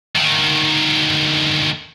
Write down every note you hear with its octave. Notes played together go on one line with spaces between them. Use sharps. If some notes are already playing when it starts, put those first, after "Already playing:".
D2 D#3